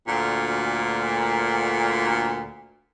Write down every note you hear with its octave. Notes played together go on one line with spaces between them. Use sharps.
D2 A#2